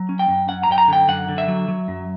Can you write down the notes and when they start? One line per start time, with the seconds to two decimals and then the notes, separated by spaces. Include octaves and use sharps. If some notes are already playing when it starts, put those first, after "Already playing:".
Already playing: F#3
0.09 C#4
0.19 G5
0.28 F#2
0.49 C#4 F#5
0.63 A#5
0.69 F#2 G5
0.78 A#5
0.88 D3 G5
1.08 F#2 F#5
1.29 D3
1.38 E5
1.48 F#3
1.68 F#3
1.88 F#2